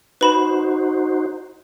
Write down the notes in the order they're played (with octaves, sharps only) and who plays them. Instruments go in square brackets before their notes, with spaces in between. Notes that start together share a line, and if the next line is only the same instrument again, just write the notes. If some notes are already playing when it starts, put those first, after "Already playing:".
[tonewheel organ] D#4 F#4 C5 [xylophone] B4 B5 E7